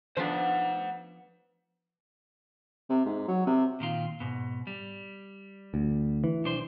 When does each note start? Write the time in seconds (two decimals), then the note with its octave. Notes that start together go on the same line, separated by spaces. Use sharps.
0.17 F3 B3 D4 C5 F#5
2.89 C3
3.05 G#2
3.28 F#3
3.46 C3
3.80 A#2 D#3 F4
4.20 G#2 B2
4.67 G3
5.74 D2
6.24 E3
6.44 B1 D4 C5